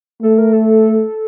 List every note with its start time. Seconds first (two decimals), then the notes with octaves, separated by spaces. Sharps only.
0.23 A3 A4
0.38 A#4
0.53 A4